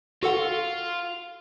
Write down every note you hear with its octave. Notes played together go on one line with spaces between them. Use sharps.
F4 F#4 A4 F#5